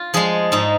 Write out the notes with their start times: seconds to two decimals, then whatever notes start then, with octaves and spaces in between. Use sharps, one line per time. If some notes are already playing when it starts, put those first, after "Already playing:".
Already playing: F4
0.14 F3 G#3 G#4
0.52 G#2 D#4